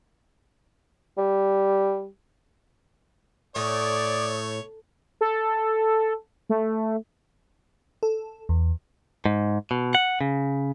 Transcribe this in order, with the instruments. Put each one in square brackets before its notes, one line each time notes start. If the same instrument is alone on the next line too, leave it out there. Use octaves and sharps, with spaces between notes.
[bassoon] G3
[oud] A2 [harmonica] A3 C#5 [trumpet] D5 [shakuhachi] D#6
[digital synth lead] A4
A3
[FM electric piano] A4
E2
[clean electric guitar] G#2
B2
F#5
C#3